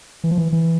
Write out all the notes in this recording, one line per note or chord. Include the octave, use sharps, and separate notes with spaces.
E3
F3
E3
E3